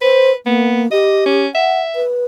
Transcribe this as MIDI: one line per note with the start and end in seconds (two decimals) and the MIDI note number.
0.01 0.35 71
0.01 0.31 72
0.46 0.90 58
0.46 0.82 59
0.92 1.44 67
0.92 1.25 75
1.26 1.48 61
1.55 2.03 76
1.55 1.80 78
1.96 2.25 71